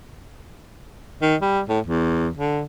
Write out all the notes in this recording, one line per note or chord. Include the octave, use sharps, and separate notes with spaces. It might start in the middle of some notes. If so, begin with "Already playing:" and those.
D#3
G3
A2
E2
D3